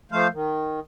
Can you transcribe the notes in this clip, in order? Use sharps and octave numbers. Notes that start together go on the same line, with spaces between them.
F3 A3 C5 F5
D#3